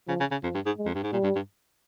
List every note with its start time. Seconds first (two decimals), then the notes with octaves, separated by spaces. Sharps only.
0.08 C#3 F3
0.20 C#3
0.31 C#3
0.43 F2 F3
0.55 G2
0.66 G#2
0.78 G#3
0.86 F2
0.95 G2
1.03 G#2
1.12 A#2 G3
1.23 G2
1.36 G2